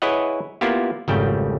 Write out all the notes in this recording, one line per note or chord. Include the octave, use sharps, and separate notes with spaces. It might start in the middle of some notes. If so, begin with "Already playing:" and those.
E4 G#4 B4 C#5 D#5 F#5
A#3 B3 E4 F4 G4
G#1 F2 C#3 G3 A3 G5